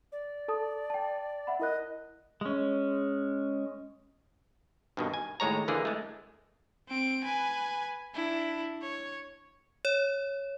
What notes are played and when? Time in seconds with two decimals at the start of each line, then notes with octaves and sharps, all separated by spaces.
0.12 D5
0.48 A4 A5 D#6
0.90 G5 A5
1.47 E5 F#5 B5
1.59 E4 A#4 D#5 F#6
2.41 G#3 C#4
4.97 G2 B2 D#3
5.14 G#5
5.40 D#2 A2 G#3 C#5 A#5
5.68 D3 E3 A#3 G#4
5.85 G#3 A3
6.88 C4 D7
7.24 B4 G#5
8.15 D4 E4
8.82 C#5
9.85 C#5